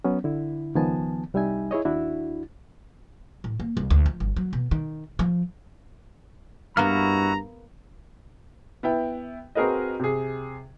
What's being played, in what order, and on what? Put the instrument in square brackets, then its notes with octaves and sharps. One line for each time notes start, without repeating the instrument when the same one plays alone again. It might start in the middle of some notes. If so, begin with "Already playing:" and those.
[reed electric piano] F#3 B3 C#4
D3 E4
C#2 D#3 F3 B3 G#5 A5
C2 G3 D#4 E5 G#5
E4 G#4 C#5 D#5
D#2 D4 E4 F#4 E5
[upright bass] A2
A#3
C2
D2
F3
G1
F#3
B2
D#3
F3
[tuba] G2 [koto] A#3 B3 [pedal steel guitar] E4 F#4 F6 [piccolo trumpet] A#5
[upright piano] B3 E4 G5
C4 F#4 G#4 A#4 B4 D#5
C3 G#4